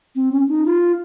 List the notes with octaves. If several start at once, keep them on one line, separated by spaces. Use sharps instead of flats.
C4
C#4
D#4
F4